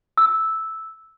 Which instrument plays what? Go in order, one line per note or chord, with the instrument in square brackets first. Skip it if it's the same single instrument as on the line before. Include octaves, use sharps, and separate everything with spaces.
[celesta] E6